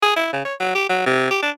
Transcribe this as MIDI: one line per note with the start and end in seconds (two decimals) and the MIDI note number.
0.02 0.15 68
0.16 0.28 64
0.33 0.43 49
0.45 0.54 73
0.60 0.75 54
0.75 0.85 67
0.89 1.01 54
1.06 1.28 48
1.31 1.38 67
1.42 1.50 62